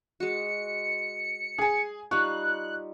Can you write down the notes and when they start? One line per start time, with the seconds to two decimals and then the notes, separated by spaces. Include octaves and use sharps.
0.20 G#3 F#4 C#7
1.58 G#4 G#5
2.11 G3 D#4 F4 C#6 F#6